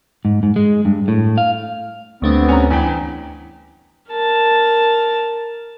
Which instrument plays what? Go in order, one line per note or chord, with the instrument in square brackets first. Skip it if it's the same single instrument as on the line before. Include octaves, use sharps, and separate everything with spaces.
[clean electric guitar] G#2
G#2
G#3
G2
A2
F5
[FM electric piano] D2 A3 D4 [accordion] G2 B3 C4
[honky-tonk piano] C#4 A#5
[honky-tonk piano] E2 E3 G5 [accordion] G#5 B5
[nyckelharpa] A#4 A5